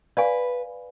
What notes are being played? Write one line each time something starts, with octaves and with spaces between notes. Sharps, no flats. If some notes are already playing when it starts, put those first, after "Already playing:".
B4 D5 F5 G#5